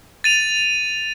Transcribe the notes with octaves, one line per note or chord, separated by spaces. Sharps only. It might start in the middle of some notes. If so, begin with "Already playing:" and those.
A6 D#7 F7